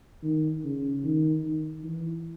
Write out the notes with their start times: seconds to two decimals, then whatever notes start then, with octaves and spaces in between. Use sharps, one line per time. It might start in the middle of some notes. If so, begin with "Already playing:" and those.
0.23 D#3
0.64 C#3
1.04 D#3
1.44 D#3
1.84 E3